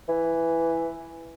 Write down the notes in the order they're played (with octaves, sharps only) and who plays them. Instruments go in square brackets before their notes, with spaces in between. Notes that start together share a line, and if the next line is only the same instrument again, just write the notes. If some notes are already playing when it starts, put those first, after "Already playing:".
[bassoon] E3